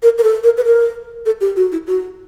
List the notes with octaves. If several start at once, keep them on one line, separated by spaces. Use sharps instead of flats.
A#4
A#4
A4
A#4
B4
A#4
A4
G4
F#4
E4
F#4